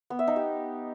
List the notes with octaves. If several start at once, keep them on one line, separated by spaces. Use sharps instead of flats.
B3
E5
D#4
G4